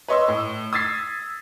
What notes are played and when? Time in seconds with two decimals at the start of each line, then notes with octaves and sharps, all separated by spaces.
0.08 B4 C#5 D#5 C6 C#6 E6
0.28 A2
0.73 D#6 E6 G#6 A6 B6 C7